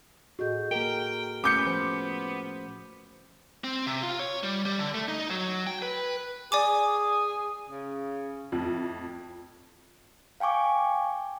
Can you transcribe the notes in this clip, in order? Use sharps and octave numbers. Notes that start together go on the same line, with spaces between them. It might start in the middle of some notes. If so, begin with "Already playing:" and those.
A2 F#4 G#4 D#5 G6
A#3 A#4 G5
A3 B3 C#4 D6 G6 C#7
F3 C5
C4
C3
F4
C#5
G3
G3
D3
A3
D#4
F#3
G5
B4
G#4 D5 G#5 D6
C#3
F2 A2
F5 G5 G#5 C#6 D6